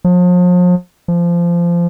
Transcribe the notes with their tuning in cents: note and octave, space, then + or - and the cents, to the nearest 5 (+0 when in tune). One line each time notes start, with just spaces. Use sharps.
F3 +40
F3 -20